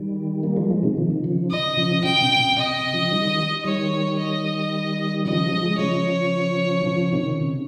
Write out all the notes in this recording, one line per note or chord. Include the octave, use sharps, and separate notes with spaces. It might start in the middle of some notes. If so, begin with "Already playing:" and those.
Already playing: D#3 G3
G3 A#3
F3 G#3
F3 G#3
C3 D#3
F3
D#3
C#3 F3
D#5
C#3 F3
C#3 G5
C3
C3
C3 D#5
C#3 F3
D#3 G3
D#3 G3 C#5
D#5
C#3 F3 D#5
F3 G#3
C#3 F3 C#5
C#3 F3
C3 D#3
C#3